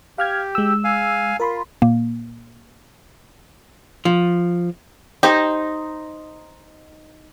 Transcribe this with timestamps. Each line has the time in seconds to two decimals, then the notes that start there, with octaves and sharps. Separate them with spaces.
0.18 G4 F5 F6 G#6
0.55 G#3 E6
0.84 F5 G#5
1.40 F4 A#4 B5 C6
1.82 A#2 A#3
4.05 F3
5.23 D#4 G4 C5